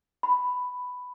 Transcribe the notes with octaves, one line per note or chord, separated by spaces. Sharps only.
B5